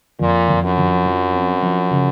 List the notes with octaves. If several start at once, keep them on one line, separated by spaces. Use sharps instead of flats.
F2 A#2
F2
F#2
F2
F3
C4
F3
C#3